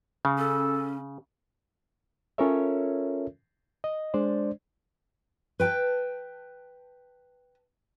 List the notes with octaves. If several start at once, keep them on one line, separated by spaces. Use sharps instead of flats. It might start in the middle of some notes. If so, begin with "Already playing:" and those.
C#3
C#4 A4
C#4 F4 A4 A#4 C#5 E5
D#5
G#3 D4 C5 D5
B4 G5 A5